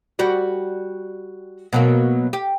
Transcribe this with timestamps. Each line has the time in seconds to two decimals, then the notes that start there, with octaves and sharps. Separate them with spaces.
0.19 G3 F#4 D5
1.73 B2 F#3 A#3
2.33 G4